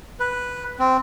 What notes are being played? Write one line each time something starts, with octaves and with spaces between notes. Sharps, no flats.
B4
C4